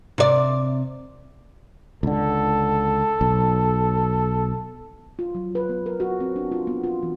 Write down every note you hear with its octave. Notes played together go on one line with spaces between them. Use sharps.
C3 D5
C#2 D3 A4
B1
F4
F#3
B4
B3
A#4
F#4
C4
D4
F4
B3
F4
E3